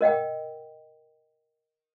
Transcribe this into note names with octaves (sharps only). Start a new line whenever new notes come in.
A#4 D#5 F#5 G5